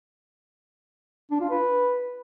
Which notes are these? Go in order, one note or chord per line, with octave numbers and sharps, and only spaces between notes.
D4
F4
B4